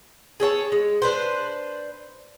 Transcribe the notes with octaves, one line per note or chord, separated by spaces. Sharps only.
G#4 A4 C#5 A5
G#3
D4 B4 C5